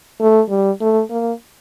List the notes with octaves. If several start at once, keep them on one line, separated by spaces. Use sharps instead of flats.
A3
G3
A3
A#3